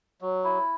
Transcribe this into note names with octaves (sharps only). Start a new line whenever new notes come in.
F#3
E4